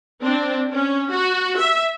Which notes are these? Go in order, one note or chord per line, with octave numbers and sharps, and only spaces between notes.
C4 D4
C#4
F#4
E5